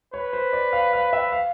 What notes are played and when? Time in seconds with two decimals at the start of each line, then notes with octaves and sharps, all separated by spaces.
0.13 B4 C#5
0.33 C5
0.53 D5
0.73 F5
0.93 F5
1.13 E5
1.32 F5